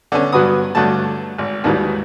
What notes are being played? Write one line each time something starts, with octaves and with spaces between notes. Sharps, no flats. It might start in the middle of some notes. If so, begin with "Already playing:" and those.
D3 B3 C#4
G2 F#3 B3 F#4 B4 D#6
G2 D3 F#3 A3 A5
G#1
D#2 G#2 D#3 E3 F#3 G3